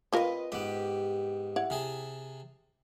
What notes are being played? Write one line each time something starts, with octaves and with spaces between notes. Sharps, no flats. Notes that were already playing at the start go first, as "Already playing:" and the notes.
C4 F4 A#4 B4 D#5
G#2 B3 G4
E4 F#5
C3 G#4 A5